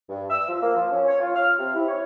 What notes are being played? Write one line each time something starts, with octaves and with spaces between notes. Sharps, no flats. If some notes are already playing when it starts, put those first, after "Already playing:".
G2
E6
F3
A#3
F3
C#4
C#5
F4
F6
C3
E4
C#5